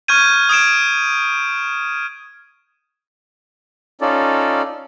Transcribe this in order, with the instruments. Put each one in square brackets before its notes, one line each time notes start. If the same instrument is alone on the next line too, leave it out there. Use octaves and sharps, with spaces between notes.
[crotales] C#6 F6 G6 G#6 D#7
D#6 G#6 D7 E7
[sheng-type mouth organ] C#4 D#4 F4 A4 D5